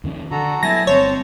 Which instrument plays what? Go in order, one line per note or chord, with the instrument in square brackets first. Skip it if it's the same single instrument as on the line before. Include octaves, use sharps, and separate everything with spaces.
[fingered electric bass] F2 D#3 C#4
[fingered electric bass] D3 [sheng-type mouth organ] F#4 A4 A#5
[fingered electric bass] F#3 A3 B3 [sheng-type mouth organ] E4 G#5 A5 [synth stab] A#6
[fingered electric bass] G1 C4 [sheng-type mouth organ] C5 A5 [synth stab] C#5